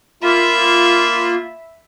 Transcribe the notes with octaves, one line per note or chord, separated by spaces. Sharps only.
A#3 F4 E5 B5